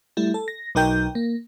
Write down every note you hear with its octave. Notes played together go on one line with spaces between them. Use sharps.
G3 A3 E4
A4
A#6
B1 F#3 D#4 A#4 G5 G6
A#3